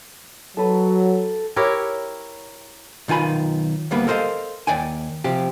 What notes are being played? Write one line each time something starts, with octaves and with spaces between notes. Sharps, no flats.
F#3 A4 B4
E4 G4 A#4 C#5
B1 D#3 F4 G#5 B5
D2 G3 A#3 B3 B4 B5
A4 A#4 C5 D#5 F5
D#2 D5 G5 G#5
C3 F3 G4